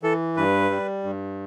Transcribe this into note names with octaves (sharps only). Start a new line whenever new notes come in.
E3 A4
G2 B4
G3
G2